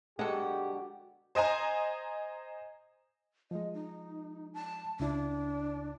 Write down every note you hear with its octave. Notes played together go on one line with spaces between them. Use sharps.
B2 D3 F#3 G#3 G4 A4 F#5
C5 D#5 G#5 A#5
F3 G#3 D#5
D#4
A5
C#2 C#3 D4 E4